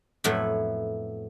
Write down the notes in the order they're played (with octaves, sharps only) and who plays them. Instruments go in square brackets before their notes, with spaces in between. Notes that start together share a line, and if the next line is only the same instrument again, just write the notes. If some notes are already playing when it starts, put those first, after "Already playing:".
[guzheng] F2 A2 F#3 A3 B3 E4